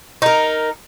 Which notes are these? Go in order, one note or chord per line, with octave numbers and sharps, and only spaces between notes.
D#4 A#4